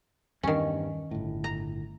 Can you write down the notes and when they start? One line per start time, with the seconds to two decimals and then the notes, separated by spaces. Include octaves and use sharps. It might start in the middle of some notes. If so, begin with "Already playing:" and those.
0.43 E2 G2 D#3 C#4
1.11 G1 A2
1.44 A#5